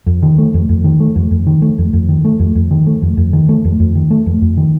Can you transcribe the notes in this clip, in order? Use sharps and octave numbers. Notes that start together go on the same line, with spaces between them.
F2
D#3
A3
F2
F2
D#3
A3
F2
F2
D#3
A3
F2
F2
D#3
A3
F2
F2
D#3
A3
F2
F2
D#3
A3
F2
F2
D#3
A3
F2
F2
D#3